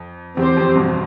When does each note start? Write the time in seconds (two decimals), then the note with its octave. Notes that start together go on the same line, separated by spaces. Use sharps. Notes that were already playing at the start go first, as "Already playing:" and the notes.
Already playing: F2
0.37 E2 C4 G4 C5
0.57 F2
0.76 G2 B2